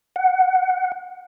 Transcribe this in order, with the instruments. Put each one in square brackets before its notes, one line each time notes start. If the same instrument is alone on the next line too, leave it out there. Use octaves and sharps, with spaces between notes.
[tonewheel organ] F#5